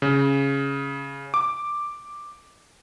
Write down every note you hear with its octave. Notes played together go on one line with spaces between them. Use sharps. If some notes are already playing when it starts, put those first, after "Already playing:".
C#3
D6